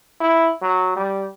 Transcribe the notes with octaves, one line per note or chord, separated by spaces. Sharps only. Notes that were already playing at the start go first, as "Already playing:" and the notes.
E4
F#3
G3